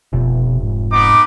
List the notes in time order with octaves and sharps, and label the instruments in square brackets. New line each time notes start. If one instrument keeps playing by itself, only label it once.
[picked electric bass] F1 [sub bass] B2
[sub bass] G#2
[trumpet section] B3 D#4 D6